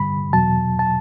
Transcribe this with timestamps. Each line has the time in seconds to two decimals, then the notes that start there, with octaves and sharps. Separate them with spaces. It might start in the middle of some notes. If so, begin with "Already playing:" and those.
Already playing: G2 D3 G3 B5
0.33 E2 B2 F#3 A5
0.79 A5